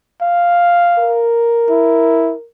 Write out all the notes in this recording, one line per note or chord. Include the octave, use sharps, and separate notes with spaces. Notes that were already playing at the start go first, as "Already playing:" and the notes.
F5
A#4
E4